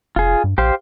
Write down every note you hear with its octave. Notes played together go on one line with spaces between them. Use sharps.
F1 F4 G#4
G2
A#1 G4 C5 F5